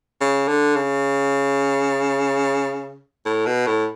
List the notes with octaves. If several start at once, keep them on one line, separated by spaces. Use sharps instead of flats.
C#3
D3
C#3
A2
B2
A2